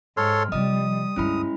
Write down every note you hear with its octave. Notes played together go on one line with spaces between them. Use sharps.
G#2 A4 C#5 C6 F6
C3 F3 G3 D#5 D#6
D2 G2 G#3 C#4 E4 B5